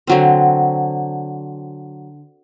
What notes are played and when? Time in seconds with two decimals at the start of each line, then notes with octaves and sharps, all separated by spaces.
0.07 D3 F#3 C4